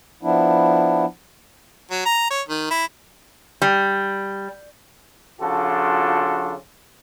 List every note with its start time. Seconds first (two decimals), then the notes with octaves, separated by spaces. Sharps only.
0.23 F3 B3 D4 E4
1.91 F#3
2.06 A#5
2.30 C#5
2.48 D#3
2.70 E4
3.62 G3
5.41 C#3 F3 D4 F4 F#4 A4